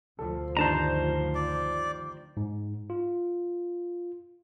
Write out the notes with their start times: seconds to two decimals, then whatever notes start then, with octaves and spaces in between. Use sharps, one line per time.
0.19 D2 F3 A4
0.57 G2 D#3 D4 C5 A5 A#5
1.35 D5
2.37 G#2
2.90 F4